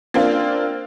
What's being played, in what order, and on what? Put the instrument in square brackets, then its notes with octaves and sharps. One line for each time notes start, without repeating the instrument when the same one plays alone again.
[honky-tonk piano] A#3 C4 D4 F4